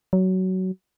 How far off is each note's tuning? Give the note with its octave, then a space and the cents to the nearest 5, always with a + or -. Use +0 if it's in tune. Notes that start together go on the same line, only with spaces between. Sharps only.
F#3 +15